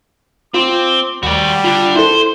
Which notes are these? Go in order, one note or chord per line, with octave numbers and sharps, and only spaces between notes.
C4 F4 D6
D#2 G3 F#4 D5
D3 D4 F4
E4 A4 C5